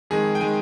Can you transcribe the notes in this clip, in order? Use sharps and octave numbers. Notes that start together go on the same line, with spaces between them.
F2 D#3 G#3 G#4
G5
D#3 G#3 G#5